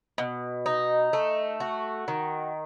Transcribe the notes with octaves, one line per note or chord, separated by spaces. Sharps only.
B2
D#4
A3
F#4
D#3